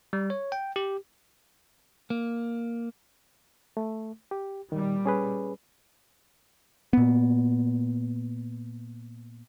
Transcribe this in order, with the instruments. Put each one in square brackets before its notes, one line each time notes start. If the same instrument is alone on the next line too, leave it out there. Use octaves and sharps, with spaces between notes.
[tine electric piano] G3
C#5
G5
G4
[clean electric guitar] A#3
[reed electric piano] A3
G4
[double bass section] A#2 G3 [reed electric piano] D#3
[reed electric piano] C#4 G#4 B4
[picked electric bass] A#2 B3